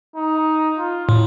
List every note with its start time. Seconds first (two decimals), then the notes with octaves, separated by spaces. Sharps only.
0.16 D#4
0.77 F4
1.09 A2